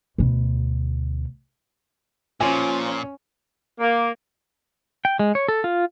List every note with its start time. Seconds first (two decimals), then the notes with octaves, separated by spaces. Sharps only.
0.18 D2 B2
2.40 A#2 F3 C#4 G#5
3.80 A#3
5.05 G5
5.19 G#3
5.35 C#5
5.48 A4
5.64 F4